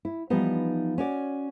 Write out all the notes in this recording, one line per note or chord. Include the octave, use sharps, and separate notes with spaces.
E4
E3 F3 G3 B3 D#4
C#4 F#4 D5